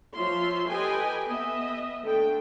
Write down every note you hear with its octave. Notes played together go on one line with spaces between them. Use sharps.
F3 F4 C#5 E5 C6
G4 A4 B4 D#5 G5 G#5
B3 D#5 E5
D3 A3 G5